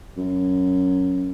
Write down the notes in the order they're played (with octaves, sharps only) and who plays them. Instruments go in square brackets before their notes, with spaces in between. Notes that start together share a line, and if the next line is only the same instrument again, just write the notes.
[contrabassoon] F#2